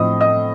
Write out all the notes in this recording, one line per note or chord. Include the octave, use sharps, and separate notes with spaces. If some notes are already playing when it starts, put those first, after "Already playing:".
Already playing: A2 F3 C4 D#5 D#6
D#5 D#6